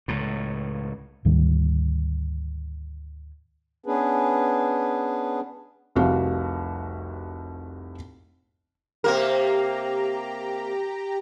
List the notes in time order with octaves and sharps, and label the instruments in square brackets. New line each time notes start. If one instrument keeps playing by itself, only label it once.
[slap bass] C#2 A2
[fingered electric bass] D2 G#2 D#3 G3
[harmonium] B3 C#4 D4 G#4 B4
[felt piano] F1 C2 C3 F#4 F5
[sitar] C3 A#3 A#4 [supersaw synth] G4 A#5